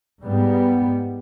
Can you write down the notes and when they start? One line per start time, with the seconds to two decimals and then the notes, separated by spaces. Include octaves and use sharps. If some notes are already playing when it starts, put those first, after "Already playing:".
0.24 G#2 G3 B3